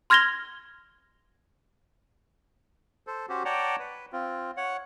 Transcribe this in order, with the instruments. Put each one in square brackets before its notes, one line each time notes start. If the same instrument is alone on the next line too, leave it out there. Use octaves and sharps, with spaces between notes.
[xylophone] C6 F6 G#6 A#6 F7 G7
[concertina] A4 C5
C#4 F#4 G4 C5
C#5 D5 F#5 G5 A5 A#5
B4
C4 F4
C#5 F#5